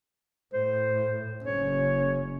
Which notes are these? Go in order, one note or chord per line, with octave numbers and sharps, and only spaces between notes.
A2 C5
F#1 C#4 C#5